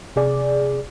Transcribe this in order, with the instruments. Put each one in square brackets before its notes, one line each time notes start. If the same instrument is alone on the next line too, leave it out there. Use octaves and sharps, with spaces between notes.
[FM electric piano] C3 G#4 D5